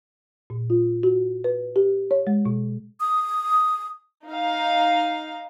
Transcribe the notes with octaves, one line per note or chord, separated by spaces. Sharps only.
A#2
F4
F#4
B4
G4
C#5
G#3
B2
D#6
D#4 F5